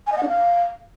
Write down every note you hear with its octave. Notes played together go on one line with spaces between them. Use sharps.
G#5
D#5
F#5
D4
F5